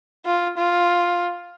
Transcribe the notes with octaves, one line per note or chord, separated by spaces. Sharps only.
F4
F4